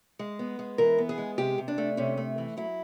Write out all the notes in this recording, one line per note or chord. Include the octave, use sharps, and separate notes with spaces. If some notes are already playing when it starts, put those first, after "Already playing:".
G#3
B3
G#3
E3 A#4
B3
G#4
G#3
C3 G4
C3
D4
A3
C3 C#4
A3
E3
F#3 E4